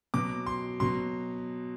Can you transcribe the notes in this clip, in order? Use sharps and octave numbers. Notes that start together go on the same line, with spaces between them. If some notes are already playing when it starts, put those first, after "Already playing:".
B2 F#3 D6
C6
B2 F#3 C6